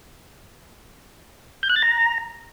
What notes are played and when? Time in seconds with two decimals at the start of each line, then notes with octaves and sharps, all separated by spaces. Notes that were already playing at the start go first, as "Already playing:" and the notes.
1.63 G6
1.69 F#6
1.76 A6
1.82 A#5